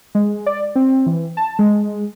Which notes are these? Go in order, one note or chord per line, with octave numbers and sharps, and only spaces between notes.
G#3
D5
C4
E3
A5
G#3